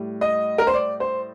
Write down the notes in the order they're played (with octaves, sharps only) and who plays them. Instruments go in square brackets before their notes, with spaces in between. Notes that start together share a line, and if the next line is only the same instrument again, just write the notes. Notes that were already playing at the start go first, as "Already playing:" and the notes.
Already playing: [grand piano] A2 G3
D#5
A#4
C5
D5
C5